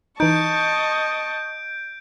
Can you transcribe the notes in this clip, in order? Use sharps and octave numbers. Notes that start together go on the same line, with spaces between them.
E3 D#4 D#5 A5 C#6 G6 D7